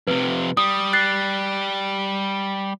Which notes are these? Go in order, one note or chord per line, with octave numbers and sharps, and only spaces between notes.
F2 C3 B4
G3 D#6
F#6 A6 C7